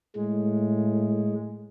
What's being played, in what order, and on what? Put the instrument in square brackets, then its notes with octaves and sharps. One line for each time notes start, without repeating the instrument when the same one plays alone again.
[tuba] A2 [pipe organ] G#3